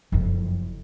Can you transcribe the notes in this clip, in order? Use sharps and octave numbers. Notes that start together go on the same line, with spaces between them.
F#1 F2